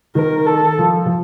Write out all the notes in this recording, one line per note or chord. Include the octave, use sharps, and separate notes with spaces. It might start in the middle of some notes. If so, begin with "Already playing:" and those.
D#3 A#4
A4
F3
F3